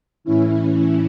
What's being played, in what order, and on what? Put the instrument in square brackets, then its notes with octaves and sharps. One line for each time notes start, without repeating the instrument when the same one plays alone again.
[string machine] A2 E3 C#4 E4